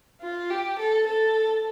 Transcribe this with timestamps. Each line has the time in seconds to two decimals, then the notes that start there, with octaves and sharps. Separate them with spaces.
0.22 F4
0.50 G4
0.79 A4
1.07 A4